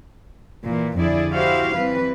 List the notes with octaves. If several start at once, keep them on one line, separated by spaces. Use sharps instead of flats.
A#2 E3
F2 D3 E4 G#4 D5
E4 F#4 G4 C5 F5
E3 G3 C4 B4